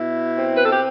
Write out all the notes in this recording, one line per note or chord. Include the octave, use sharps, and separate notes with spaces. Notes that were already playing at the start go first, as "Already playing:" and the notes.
Already playing: B2 E4
C4
B4
A4
G4